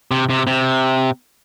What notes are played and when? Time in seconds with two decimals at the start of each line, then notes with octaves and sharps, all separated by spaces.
0.11 C3
0.30 C3
0.47 C3